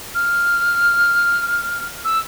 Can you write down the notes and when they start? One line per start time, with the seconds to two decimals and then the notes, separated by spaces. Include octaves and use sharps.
0.15 F6
2.05 E6